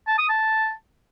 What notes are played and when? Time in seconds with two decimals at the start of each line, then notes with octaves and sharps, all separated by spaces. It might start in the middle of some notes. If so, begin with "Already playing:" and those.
0.08 A5
0.18 D#6
0.29 A5